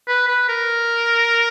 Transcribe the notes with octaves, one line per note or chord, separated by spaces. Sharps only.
B4
B4
A#4